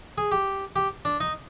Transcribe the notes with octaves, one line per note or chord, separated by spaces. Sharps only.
G#4
G4
G4
D4
D#4